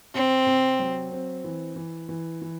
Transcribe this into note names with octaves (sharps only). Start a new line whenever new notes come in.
C3 C4
C3
F#3
C4
E3
E3
E3
E3